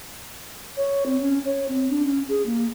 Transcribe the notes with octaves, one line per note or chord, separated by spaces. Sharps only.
C#5
C4
C#4
C#5
C4
D4
C#4
G#4
A#3